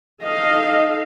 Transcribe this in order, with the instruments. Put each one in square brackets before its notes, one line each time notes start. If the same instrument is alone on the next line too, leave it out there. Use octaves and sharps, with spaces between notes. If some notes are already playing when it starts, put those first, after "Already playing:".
[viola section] D#4 A4 F5 [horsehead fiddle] D#5